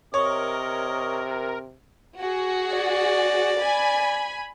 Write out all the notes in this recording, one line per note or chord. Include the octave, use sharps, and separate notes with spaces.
C3 A#4 C#5 D#5
F#4 G#4
D5
G#5 B5